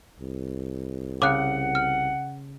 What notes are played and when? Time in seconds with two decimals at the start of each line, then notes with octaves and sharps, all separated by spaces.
0.20 C2
1.22 C#3 F#5 D6 F#6
1.75 F6